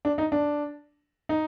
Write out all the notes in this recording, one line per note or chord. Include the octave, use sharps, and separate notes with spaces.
D4
D#4
D4
D#4